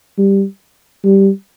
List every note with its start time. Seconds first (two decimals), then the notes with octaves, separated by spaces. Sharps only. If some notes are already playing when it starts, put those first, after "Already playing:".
0.18 G3
1.04 G3